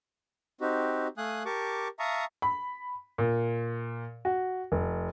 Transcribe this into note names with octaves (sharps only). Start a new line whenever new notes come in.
C4 D#4 F#4 G4
A3 F5 G#5 D#6 F#6
G4 A#4 A5 C#6 D6
E5 F5 A5 A#5 C#6 D#6
B5
A#2
F#4
F1